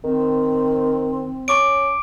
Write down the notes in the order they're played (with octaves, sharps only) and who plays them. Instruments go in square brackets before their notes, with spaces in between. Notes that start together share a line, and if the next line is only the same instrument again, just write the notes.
[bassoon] D#3 [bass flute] C4
[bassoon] C#4 [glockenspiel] C#6 D6 D7